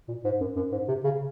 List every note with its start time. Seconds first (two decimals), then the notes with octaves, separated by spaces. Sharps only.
0.08 A#2
0.24 G#2
0.41 F#2
0.56 F#2
0.72 G#2
0.88 C3
1.04 C#3